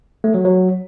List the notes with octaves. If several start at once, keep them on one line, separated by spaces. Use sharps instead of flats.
A3
F#3
F#3